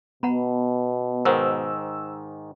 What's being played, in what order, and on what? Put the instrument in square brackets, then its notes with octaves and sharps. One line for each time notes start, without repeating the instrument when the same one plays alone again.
[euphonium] B2 [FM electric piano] B3 [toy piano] F#5 A#5 B5
[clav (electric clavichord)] G#2 D#3 [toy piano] A#4 C5 F#5 [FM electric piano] E6